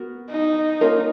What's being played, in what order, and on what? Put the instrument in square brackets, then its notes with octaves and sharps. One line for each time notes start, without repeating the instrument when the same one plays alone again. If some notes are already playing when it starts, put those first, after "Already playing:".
Already playing: [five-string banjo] B3 F#4 A#4
[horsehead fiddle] D#4
[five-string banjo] A#3 C#4 F4 A#4